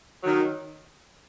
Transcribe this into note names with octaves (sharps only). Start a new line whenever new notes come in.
D#3 F#3